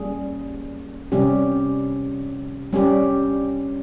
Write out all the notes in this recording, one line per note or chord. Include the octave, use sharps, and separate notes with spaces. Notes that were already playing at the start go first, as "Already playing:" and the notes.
Already playing: G3 A#3 C#4 G#4
C3 G3 C#4 G4
G3 C#4 G4